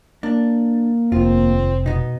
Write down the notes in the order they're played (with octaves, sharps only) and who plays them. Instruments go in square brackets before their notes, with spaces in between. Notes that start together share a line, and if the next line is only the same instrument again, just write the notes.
[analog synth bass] A#3 [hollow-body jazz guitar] D4
[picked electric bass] F1 [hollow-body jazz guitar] D#2 F4 [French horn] C4
[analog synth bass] B2 [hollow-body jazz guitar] B3 D#4